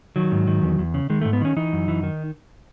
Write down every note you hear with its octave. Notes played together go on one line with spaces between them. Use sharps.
D#3 F#3
G#2
D#3
E2
E2
C#3
D#3 G#3
A3
G#2
B3
D#3 C#4
E3 D#4
F#2
E3
D#3